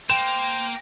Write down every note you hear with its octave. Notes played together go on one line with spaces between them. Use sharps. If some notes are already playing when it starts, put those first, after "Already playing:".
A#3 C5 G5 E7